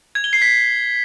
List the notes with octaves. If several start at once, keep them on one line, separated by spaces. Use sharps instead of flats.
G#6
G7
C7
B6